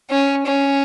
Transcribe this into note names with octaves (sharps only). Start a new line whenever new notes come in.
C#4
C#4